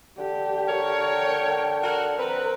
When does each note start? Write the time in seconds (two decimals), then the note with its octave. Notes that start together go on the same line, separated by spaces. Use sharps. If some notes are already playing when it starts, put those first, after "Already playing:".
0.19 D3 G4
0.68 A#4 C#5
1.03 G5
1.83 F#4 A#4
2.18 C4 A#4 B4